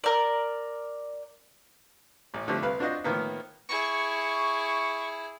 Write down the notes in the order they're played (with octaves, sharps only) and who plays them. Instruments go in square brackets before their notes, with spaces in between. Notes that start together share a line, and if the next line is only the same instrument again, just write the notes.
[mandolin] A#4 D5
[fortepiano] A1 A2
D3 F3 A3 C4 G4 C5
C2 B4 F5
C4 D4 F4 F#4 C5 D#5
A2 D#3 F3 A#3 B3
[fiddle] E4 G#4 [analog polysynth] C#6